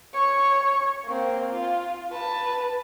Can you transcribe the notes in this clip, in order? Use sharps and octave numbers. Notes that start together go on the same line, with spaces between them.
C#5 C#6
A#3 C4
F4
B4 A5